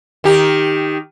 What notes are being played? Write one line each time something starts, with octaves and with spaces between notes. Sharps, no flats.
D#3 G4